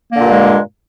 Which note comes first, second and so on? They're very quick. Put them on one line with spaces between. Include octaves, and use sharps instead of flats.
A#3 D3 A#2 G2 G#3